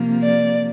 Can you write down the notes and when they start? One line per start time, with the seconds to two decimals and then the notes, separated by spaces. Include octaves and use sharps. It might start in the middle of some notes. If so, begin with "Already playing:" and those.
Already playing: C3 F3 A#3
0.22 D5